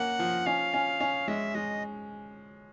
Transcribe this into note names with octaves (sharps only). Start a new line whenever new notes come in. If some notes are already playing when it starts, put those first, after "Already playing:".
Already playing: A#3 C#4 F#5
F3
C#4 F5
C#4
C#4
G#3 E5
G#3 D#5